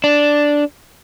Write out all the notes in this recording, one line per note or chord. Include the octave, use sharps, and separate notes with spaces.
D4